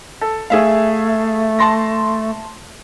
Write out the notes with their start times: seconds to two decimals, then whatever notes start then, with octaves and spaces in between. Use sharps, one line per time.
0.21 A4
0.50 A3 G#4 E5 F5
1.59 A5 C6 A#6